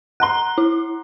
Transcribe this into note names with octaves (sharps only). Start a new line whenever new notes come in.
F#5 A#5 C6 F#6 G7
E4